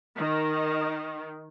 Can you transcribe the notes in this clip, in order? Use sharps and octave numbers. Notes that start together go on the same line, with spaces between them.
D#3